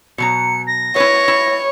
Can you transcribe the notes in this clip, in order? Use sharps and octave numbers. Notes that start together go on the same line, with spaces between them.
B2 F#3 A#5 C#7
A#6
E4 B4 C#5
E4